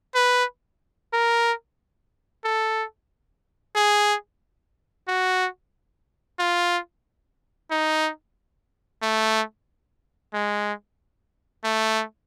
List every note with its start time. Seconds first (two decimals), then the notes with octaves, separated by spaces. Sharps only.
0.15 B4
1.13 A#4
2.45 A4
3.76 G#4
5.08 F#4
6.39 F4
7.71 D#4
9.02 A3
10.34 G#3
11.64 A3